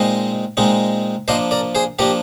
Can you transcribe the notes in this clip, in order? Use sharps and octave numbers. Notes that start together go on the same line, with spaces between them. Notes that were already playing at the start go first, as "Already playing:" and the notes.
Already playing: A#2 G#3 C4 D#4 C5 D#5
A#2 G#3 C4 D#4
F3 A#3 D4 C5 D#5
A#4 D5
G#4 C5
F3 A#3 D4 G4 A#4